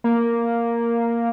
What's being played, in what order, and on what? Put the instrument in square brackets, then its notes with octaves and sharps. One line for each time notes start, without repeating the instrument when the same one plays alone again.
[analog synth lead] A#3